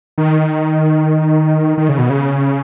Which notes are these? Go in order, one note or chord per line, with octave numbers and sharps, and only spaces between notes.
D#3
D#3
C#3
B2
C#3